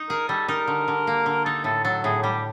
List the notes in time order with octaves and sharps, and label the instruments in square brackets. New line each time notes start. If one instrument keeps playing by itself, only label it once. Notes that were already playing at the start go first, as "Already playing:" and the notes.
Already playing: [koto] D#4
[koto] G#4 [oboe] A#4
[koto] G3 [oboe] A4
[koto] D#4 [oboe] A#4
[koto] D3
D3
A#3
D3
[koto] D#4 [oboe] A4
[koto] A2 [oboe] A4
[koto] F#3 [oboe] A4
[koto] A2 [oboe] G#4
[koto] G3 [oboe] G4